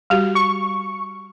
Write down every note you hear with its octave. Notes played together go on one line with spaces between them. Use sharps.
G3 F#4 G4
C#6